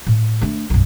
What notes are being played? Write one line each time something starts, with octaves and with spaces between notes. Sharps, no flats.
A2
A3 D4
B1 F#2